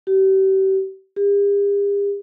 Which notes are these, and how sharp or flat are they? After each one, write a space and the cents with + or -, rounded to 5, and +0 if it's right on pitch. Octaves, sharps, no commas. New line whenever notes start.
G4 -35
G4 +45